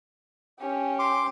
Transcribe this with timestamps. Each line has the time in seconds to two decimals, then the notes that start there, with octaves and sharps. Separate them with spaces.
0.60 C#4 G4
0.99 C6 D6